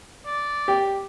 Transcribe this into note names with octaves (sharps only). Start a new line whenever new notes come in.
D5
G4